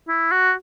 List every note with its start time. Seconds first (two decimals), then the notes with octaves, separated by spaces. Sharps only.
0.08 E4
0.31 F#4